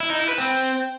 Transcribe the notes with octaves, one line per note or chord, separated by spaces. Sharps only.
E4
D#4
E4
B4
C4